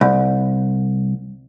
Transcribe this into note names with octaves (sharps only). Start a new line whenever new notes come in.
C2